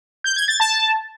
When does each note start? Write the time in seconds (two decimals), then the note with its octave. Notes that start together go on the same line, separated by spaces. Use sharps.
0.24 G6
0.36 G#6
0.48 A6
0.60 A5